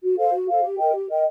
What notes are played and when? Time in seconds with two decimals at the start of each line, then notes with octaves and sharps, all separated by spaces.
0.03 F#4
0.18 A4 C5 F5
0.33 F#4
0.49 A4 C5 F5
0.63 G4
0.78 A#4 D#5 G5
0.93 G4
1.09 A#4 D#5 G5